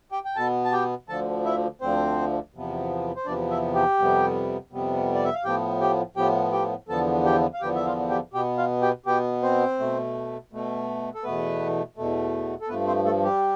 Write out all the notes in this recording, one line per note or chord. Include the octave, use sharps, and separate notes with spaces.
G4 G5
G5
B2 B3 A4 A5
A5
G4 G5
D2 D3 F3 A4 A5
E4 E5
D2 D3 F3 C4 C5
E2 C3 F3 B3
C5
E2 C3 F3 B3 D4 D5
E4 E5
G4 G5
F2 C3 G3 B3
F2 C3 G3 B3
D5
E5
F5
A2 F3 B3 G4 G5
G4 G5
A2 F3 B3 G4 G5
G4 G5
E2 D3 F3 B3 A4 A5
G4 G5
F5
E2 D3 F3 B3 G4 G5
E5
F4 F5
G4 G5
B2 B3 G4 G5
F4 F5
G4 G5
B2 B3 G4 G5
C4 C5
B2 A3
B2 A3
A4
E2 B2 A3 B3 B4
E2 B2 A3
A4
G2 F3 A3 B3 B4
C4 C5
A3 A4
G3 G4